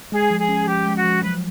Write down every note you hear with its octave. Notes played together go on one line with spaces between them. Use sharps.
G#3 G#4
F3
G#4
C#4
F3 G4
G#3
F#4
F3
F#3 B4